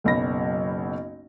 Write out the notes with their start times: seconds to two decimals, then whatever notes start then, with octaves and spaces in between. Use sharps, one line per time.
0.04 F#1 B1 B5 A#6